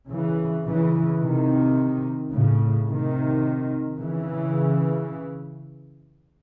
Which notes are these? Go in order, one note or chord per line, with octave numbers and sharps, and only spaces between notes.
C#3 E3
C#3 E3
C3 D#3
A2 C#3
C3 D#3
C#3 E3